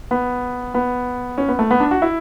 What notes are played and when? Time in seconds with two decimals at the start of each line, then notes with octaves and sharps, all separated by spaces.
0.11 B3
0.74 B3
1.38 C#4
1.48 B3
1.59 A3
1.71 B3
1.80 D4
1.91 F#4
2.02 E4